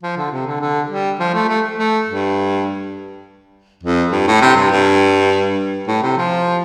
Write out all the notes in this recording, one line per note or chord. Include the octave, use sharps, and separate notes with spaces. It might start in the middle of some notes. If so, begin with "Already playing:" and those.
F3
D3
C3
D3
D3
G3
F3
A3
A3
A3
G2
F2
G2
A2
C3
G2
G2
A2
C3
F3